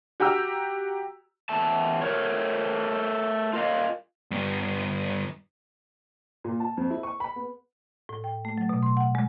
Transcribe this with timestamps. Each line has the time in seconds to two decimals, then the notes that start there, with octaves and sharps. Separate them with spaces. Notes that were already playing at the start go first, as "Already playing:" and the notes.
0.20 F#4 G4 G5 A#5 E6
1.49 E2 E5 A5
2.01 A3 A#4 C#5
3.53 F4 A#4 D#5 F5
4.31 G2 B3
6.44 A#2
6.60 A5
6.77 F2
6.90 E4
7.03 C#6
7.20 B5
7.36 B3
8.09 A2
8.24 G5
8.45 A3
8.58 F#3
8.69 B2
8.83 C6
8.97 F#5
9.15 G#3